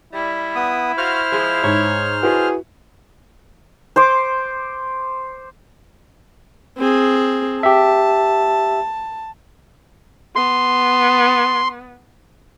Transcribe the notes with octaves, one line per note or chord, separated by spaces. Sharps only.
G3 E4
B3 D#6
F#4 C5 F5 F6
F3 G#3 G#4
G#2 C#5
F#3 G3 A3 E4 F#4 G#4 B4
C5 C6 D6
C4 G#4
G4 E5 A5
B3 C6